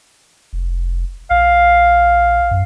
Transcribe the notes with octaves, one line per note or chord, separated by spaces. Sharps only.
F1
A#1 F5
F#2